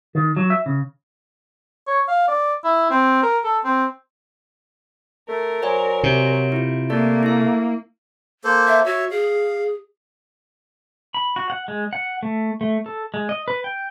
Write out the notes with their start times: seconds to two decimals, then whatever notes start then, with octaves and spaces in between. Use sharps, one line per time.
0.15 D#3
0.37 F#3
0.50 E5
0.66 C#3
1.88 C#5
2.08 F5
2.28 D5
2.64 E4
2.90 C4
3.23 A#4
3.44 A4
3.64 C4
5.29 A3 A#4
5.62 F#3 C5 D5 G#5
6.03 C3
6.52 E4 F4
6.90 A3 A#3 D5
7.23 E4 E5
8.44 A#3 A4 C5
8.67 E5
8.86 F#4 C#5 E5
9.11 G#4 F5
11.14 B5
11.36 F#4
11.50 F#5
11.68 G#3
11.93 F#5
12.23 A3
12.61 A3
12.86 A4
13.14 G#3
13.29 D#5
13.48 B4
13.64 G5